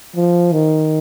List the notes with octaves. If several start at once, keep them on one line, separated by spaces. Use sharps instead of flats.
F3
D#3